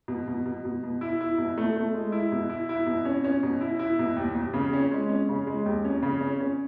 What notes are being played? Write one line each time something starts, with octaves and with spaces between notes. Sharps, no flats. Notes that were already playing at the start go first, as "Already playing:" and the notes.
B2
B2
B2
B2
B2
E4
E4
B2
A3
A3
G#3
E4
B2
E4
E4
B2
C#4
C#4
B2
E4
E4
B2
D#2
D#2
C#3
C#4
G#3
C#4
C#3
G#3
D#2
C#4
C#3
C#4
C#4